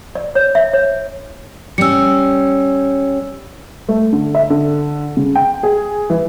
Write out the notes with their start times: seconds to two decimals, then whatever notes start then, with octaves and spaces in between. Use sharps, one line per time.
0.15 D5
0.35 C#5
0.55 E5
0.73 C#5
1.78 G3 C#4 E6 C#7
3.89 A3
4.12 D3
4.35 E5
4.50 D3
5.17 C#3
5.35 G5
5.63 G#4
6.10 E3